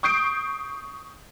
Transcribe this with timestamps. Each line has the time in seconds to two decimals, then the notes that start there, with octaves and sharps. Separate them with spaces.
0.03 C#6 D#6 G6 C7 D7